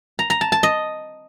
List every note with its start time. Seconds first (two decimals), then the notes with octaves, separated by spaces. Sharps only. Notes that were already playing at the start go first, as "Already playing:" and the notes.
0.19 A#5
0.30 A#5
0.41 A5
0.52 A5
0.63 D#5